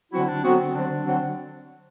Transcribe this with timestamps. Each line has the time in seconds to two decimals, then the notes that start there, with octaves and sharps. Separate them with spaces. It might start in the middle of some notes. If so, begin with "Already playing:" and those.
0.12 D3 F#3 C4 E4 F#4
0.28 D4
0.44 D3 F#3 B3 C4 F#4
0.60 C4
0.75 D3 F#3 C4 D4 F#4
1.06 D3 F#3 C4 F#4